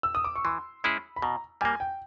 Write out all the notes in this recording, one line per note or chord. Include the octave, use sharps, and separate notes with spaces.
E6
D#6
D6
C#6
E3 C6
G#3 C#4 E4 G#4 B5
B5
B2 A#5
G3 A#3 G#5
G5